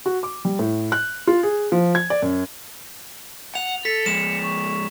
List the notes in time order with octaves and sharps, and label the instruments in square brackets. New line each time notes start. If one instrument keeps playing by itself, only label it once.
[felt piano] F#4
D6
G3
A2
F#6
F4
G#4
F3
G#6
D5
F#2
[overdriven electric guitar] F#5 [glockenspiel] F7
[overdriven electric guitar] A4 [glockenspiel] B6 [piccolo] C#7
[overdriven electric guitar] F3 G#3 [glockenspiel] E7
[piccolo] C#6